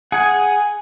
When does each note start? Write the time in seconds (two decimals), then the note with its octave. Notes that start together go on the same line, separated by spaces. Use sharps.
0.12 G#4 F#5 G#5